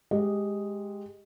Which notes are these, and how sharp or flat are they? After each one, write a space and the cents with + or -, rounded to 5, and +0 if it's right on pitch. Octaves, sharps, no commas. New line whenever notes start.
G#3 +0 G4 +10 D#5 +0